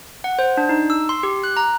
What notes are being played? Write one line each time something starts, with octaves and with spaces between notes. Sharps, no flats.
F#5
C5
D4
D#4
E6
C6
G4
F#6
A#5